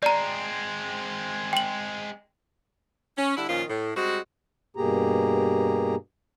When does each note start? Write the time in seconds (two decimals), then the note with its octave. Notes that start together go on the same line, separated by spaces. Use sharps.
0.03 G#3 C4 D5 A#5
1.53 G5 F#7
3.18 C#4
3.37 D3 G3 E4
3.49 A#2 D#3 F3 C#4 F4
3.70 A2
3.97 G3 G#3 C4 F#4
4.77 G2 B2 A#3 G4 G#4 A#5